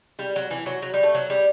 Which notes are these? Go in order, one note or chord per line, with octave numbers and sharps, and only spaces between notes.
G3
F#3
E3
F#3
F#3
G3
A3
F#3
G3